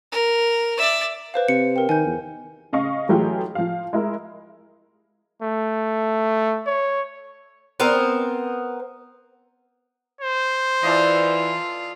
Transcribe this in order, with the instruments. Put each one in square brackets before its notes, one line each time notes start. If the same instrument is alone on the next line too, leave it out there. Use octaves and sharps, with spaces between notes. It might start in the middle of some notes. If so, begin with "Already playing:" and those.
[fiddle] A#4
D5 E5
[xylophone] B4 C5 F5
[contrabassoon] C3 [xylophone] C#7
[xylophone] A#4 G5
[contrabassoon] D#3 [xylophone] G#5 G6
[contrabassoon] E2
[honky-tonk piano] C#3 D#5 F5 C#6
E3 F#3 A3 F4 G4 G#4
F3 F5
G#3 E4 A#4
[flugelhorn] A3
C#5
[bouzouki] B3 C4 A#4 C5
[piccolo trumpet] C5
[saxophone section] E3 [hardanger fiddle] F4 [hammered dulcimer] A4 D5 D#5